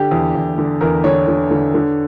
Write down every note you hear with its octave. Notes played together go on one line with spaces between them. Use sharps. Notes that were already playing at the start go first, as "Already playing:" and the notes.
Already playing: D3 G4
E2
E2
D3
E2 A#4
D3 C#5
D3
D3
D3